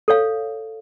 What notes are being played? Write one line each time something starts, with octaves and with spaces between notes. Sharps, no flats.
A4 C#5 F5